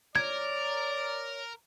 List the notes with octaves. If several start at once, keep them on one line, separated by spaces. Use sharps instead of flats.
A#4 C#5 D5 G#6